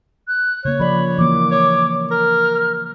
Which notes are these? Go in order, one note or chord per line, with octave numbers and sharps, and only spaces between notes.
F#6
C#3 A#3 C#5
F3 D5 B5
E3 A#3 D6
C#5
A#4 F6